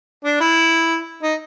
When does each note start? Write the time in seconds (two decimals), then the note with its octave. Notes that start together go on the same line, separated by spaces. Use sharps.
0.24 D4
0.40 E4
1.23 D#4